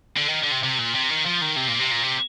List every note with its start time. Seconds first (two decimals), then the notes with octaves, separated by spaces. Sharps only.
0.17 D3
0.29 D#3
0.44 D3
0.52 C3
0.63 C3
0.79 A#2
0.95 C3
1.10 D#3
1.25 F3
1.41 D#3
1.56 C3
1.68 A#2
1.80 C3
1.91 A#2
2.03 C3